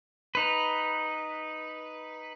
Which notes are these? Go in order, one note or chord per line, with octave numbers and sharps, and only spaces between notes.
D#4 B4